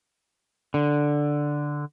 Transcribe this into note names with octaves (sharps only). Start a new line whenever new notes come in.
D3